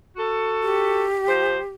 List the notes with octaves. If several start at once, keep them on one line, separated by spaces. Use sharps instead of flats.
F#4 A4
G4
F3 C5